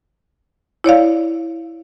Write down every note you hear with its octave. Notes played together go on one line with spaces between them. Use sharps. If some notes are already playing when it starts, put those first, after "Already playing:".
E4 C#5 D5 F5